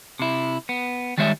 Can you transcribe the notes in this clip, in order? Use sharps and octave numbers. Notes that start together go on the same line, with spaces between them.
C3 E4
B3
D#3 G3 G#3 C#5 E5